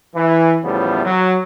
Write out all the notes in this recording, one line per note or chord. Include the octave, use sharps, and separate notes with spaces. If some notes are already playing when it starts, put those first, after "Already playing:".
E3
E2 A2 C#3 F3 G3 B3
F#3